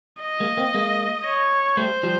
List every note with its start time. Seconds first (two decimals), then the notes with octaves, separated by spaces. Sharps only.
0.23 D#5
0.40 G#3 A#3
0.57 A#3 C4
0.75 G#3 A#3
1.25 C#5
1.77 G3 A3 C5
2.03 F3 G3